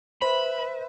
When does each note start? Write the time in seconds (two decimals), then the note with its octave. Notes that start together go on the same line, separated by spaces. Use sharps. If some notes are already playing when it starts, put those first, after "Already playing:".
0.22 B4 C5 E5 B5